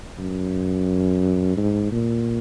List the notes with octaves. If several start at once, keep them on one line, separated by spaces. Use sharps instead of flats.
F#2
G#2
A#2